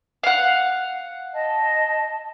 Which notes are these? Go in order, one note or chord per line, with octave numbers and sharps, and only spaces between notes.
F5 F#5
D#5 A5